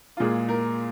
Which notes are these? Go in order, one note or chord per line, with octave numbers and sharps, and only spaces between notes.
F4
A#2 G#3 G#4
A#4